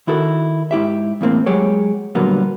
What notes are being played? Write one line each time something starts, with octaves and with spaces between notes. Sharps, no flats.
D#3 E4 F#4 A4 A#4
G#2 E4 G4 E5
E2 A2 A#3 C4
F#3 G#3 G4 C#5
A#2 D3 F#3 G3 A#3 B3